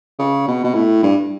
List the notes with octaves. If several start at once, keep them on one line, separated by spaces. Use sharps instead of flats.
C#3
B2
B2
A2
G2